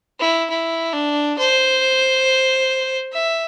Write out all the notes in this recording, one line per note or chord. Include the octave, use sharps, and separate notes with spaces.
E4
E4
D4
C5
E5